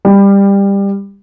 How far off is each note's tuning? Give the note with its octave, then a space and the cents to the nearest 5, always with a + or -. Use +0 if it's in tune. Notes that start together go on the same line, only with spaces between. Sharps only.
G3 +20